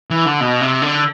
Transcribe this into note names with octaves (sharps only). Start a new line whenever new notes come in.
E3
D3
B2
C3
D3